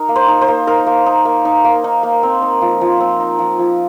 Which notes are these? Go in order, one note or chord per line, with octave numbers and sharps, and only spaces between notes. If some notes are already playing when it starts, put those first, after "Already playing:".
Already playing: D#4 A#4
A#3
C5
D#4
C5
A#3
D#4 A#4
A#3
D#4
A#3
D#4
A#3
D#4
A#3
C4
D#4
F3
F3
C4
D#4
F3
F3